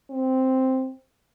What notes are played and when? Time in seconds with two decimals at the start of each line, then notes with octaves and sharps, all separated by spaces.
0.11 C4